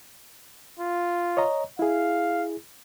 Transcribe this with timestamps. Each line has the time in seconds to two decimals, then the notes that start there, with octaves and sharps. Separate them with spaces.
0.80 F4
1.37 C#5 D#5 A#5
1.79 E4 G#4 F5